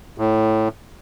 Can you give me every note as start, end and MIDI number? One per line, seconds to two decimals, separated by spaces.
0.18 0.68 45